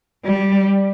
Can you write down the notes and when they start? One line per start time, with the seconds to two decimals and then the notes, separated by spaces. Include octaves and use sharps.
0.25 G3